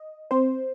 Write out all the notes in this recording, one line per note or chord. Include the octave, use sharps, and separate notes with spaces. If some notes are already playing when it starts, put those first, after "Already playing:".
Already playing: D#5
C4 C5